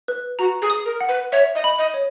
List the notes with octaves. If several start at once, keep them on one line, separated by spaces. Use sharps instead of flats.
B4
F#4 A#5
G#4
D#6
A#4
F#5
B4
C#5 E5
D#5
B5
D#5
C#5